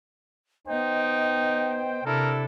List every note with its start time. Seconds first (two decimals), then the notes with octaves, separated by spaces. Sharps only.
0.67 B3 D#4 C5 D#5 G5
2.06 C3 D4 E4 A4 A#4